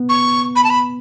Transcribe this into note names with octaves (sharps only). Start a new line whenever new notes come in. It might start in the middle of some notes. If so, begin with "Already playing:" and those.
Already playing: B3
C#6
B5
A5
B5